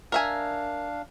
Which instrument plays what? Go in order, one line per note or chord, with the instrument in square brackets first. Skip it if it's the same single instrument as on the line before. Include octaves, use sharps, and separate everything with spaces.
[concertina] D4 F5 [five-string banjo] A#4 E5 G#5